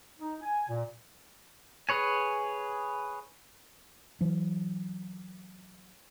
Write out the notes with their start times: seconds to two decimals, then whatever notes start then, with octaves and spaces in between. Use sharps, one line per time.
0.20 D#4
0.41 G#5
0.68 A#2
1.89 G#4 B4 C#5 G#5
4.21 E3 F#3